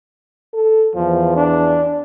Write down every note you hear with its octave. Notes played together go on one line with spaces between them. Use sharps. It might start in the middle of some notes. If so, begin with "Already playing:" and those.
A4
E2 F3
D4